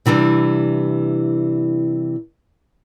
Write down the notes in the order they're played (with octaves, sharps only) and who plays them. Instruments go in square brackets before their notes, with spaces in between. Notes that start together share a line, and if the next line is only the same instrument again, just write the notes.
[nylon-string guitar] C3 E3 G3 D4